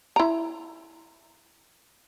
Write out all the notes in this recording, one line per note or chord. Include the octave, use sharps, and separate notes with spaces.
E4 A#5